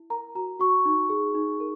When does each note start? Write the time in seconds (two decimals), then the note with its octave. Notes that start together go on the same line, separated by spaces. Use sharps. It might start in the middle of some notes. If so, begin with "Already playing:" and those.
Already playing: E4
0.10 A#4 A#5
0.35 F#4 A#5
0.60 F#4 C#6
0.85 D#4
1.10 G#4
1.35 D#4
1.60 A#4